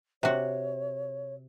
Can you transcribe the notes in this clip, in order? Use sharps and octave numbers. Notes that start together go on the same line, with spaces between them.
C3 F#4 C#5